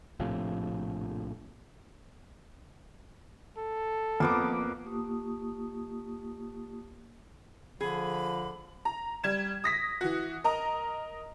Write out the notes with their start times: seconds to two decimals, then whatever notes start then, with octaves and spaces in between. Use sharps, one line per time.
0.20 A#1 A2 C3 F3
3.57 A4
4.20 F2 A#3 B3 D6
4.85 A#3 F4 G4 A5 C#6 D#6
7.81 D3 F3 G#4 B5
8.85 A#5
9.24 G3 G#6 E7
9.64 D#6 A#6 B6
10.01 E3 F#4
10.44 A#4 D#5 A#5